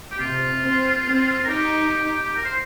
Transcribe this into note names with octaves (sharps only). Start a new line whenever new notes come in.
G4
C3 F4
C4
C4
A#4
D#4 G4
A#4
C5